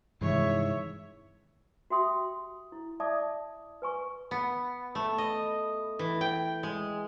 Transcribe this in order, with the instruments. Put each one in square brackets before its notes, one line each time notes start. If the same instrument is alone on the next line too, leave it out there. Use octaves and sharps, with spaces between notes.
[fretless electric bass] G2 C3 D#3 [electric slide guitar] E3 G#3 [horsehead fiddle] C#5 E5
[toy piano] F#4 G4 E5 G5 C6 D#6
E4
D5 E5 A5 D6 D#6
B4 G#5 C#6
[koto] B3
A3
D#5
E3
G5
G#3